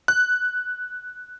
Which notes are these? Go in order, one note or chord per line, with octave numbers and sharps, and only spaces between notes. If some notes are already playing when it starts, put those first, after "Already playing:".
F#6